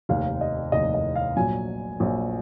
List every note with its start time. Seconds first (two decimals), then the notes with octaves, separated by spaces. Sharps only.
0.09 F1 D#2 D#3 F5
0.41 D#5
0.72 F1 D#2 D#3 D#5
0.94 D#5
1.16 F5
1.37 A#1 A#2 F#3 G#5
2.00 A#1 A#2 F#3